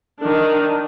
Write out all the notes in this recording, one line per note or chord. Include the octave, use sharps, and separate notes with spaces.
D#3 D4